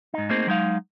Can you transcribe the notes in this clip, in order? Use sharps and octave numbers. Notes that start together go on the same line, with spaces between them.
G#2 D#4
A3 A#3 C4 D#4 G#4 C5
F#3 G#3 D#4 F5